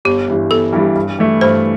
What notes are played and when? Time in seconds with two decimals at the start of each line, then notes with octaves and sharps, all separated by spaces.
0.05 G1 G4
0.28 G2 E3 G3
0.51 G1 A4
0.73 G2 E3 G3
0.96 G2
1.19 E3 A3 E4
1.41 G2 C5